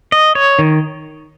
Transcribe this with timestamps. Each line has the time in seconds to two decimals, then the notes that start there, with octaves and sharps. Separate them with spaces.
0.12 D#5
0.35 C#5
0.59 D#3